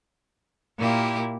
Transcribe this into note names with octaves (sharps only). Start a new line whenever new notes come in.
A#2 A#3 E4 G4